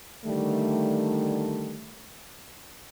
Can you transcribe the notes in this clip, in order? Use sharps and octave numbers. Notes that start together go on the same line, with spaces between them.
D3 D#3 G3 A3